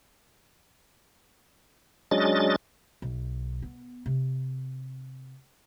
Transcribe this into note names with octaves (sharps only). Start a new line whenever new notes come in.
F#3 G#3 C#4 D4 D#5 A6
B1
B3
C3